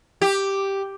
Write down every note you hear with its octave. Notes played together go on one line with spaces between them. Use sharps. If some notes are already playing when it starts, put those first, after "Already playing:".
G4